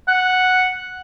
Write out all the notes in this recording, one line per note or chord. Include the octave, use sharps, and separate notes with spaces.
F#5